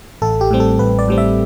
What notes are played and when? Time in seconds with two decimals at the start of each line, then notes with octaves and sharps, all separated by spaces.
0.22 A1 A4
0.41 G4
0.51 A2 G3 C4
0.60 A4
0.79 A1 B4
0.99 D5
1.08 A2 G3 C4
1.18 E5